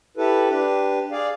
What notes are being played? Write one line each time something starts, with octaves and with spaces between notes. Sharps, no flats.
E4 G4 A4 B4
D4 G4 B4
G#4 D5 F5